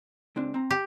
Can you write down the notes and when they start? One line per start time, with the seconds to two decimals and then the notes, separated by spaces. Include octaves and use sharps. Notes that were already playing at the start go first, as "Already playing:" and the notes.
0.36 C#2 C4 D4
0.54 C4 A#5
0.71 G4